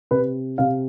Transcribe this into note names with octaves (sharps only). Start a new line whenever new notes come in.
C3 B4
C3 F5